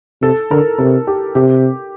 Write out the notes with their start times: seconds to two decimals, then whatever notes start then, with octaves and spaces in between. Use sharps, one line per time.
0.22 C3 A4
0.51 D3 A#4
0.79 C3 A#4
1.07 G4
1.35 C3 G4